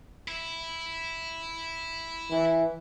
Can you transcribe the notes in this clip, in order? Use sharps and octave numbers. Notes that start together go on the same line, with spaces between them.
E4
E3